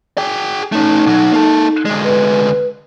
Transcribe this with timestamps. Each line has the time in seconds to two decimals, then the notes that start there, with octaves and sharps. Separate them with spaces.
0.18 G#4 G5
0.72 A3 C#4 D#4
1.06 B1 F#3
1.32 A#3 A4
1.85 D2 G#3
2.04 B4